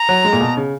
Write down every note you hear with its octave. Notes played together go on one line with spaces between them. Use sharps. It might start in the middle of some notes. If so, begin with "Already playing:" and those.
Already playing: A#5
F#3
G#3
A#2
B2
C#3